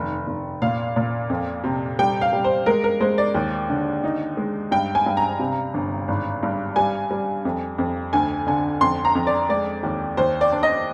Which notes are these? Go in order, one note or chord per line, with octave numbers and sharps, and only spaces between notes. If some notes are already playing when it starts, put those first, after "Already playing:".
Already playing: F1 D#3
F1
A#2 F5
A#2
F2
C3
G3 G5
F5
G3
C5
G#3 A#4
A#4
G#3 C5
D5
D#2
D3
D#4
G#3
G2 G5
G#5
G2
A#5
C3
G1
G#1
G2
G3 G#5
G3
F2
F2
D2 G#5
D3 G#5
F2 C6
A#5
F2
D5
G#3 D5
D#2
D#2 C5
D5
D4
D#5